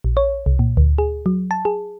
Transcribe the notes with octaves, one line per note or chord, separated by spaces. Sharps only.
A#1
C#5
C2
A#2
D2
G#4
F#3
A5
G#4